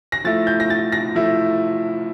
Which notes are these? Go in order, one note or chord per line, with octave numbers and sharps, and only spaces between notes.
A#6
F3 A3 E4 A6
G6
A#6
A6
A#6
F3 A3 E4